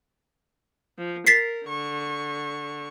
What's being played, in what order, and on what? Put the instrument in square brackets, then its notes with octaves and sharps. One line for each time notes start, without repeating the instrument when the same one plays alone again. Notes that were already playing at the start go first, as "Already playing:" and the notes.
[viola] F3
[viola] A#4 [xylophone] A6 B6 C7
[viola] D3 C#6